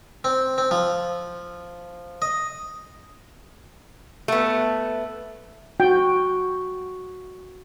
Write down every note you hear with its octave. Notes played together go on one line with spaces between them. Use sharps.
C4
C4
F3
D#5
A3 B3
F#4 G5